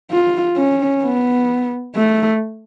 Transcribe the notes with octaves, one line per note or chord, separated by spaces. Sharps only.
F4
C#4
B3
A3